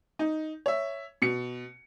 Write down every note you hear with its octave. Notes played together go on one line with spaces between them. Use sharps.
D#4
C#5 E5
B2 C#7